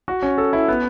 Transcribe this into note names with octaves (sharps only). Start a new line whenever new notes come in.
F#4
C#4
A4
E4
B3